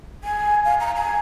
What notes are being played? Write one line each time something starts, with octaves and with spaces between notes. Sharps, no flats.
G#5
F5
A#5
G#5